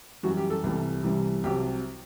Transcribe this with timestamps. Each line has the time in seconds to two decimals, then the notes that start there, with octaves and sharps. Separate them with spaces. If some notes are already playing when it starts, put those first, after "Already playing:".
0.23 F#2 E3 G3 F#4
0.37 G4
0.50 A4
0.63 C2 C3 E3 G3
1.04 C2 C3 E3 G3
1.44 C2 C3 F#3 G4